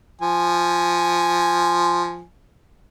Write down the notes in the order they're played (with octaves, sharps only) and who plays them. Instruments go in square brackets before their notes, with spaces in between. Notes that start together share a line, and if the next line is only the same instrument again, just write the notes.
[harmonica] F3 G#5